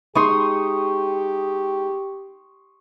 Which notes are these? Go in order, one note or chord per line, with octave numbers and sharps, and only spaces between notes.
G#3 D#4 G4 C6 C#6 D#6